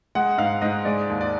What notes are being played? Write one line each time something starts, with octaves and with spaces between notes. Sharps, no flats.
G#3 F#5
G#2 F5
G#2 D#5
G#3 D5
D#2
D5